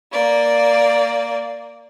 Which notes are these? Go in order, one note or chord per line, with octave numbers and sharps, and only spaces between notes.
A#3 D5